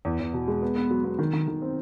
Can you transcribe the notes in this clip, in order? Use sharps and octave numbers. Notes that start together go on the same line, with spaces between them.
E2
E2
B2
G#3
B3
B3
F#3
B3
D#3
D#3
D#3
C4